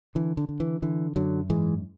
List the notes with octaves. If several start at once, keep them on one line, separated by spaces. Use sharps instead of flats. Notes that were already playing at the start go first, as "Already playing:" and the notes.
D3 E3
D3
D3
E3
D3 E3
F#2 D3 F#3
G#2 E3 G#3